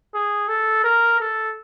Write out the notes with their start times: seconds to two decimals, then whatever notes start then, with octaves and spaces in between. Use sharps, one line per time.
0.14 G#4
0.48 A4
0.84 A#4
1.20 A4